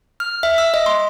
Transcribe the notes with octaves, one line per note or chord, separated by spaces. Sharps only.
F6
E5
E6
D#5
C6